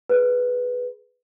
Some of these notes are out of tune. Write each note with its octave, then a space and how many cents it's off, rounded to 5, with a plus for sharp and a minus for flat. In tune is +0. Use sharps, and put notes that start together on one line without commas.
G#4 +10 B4 +0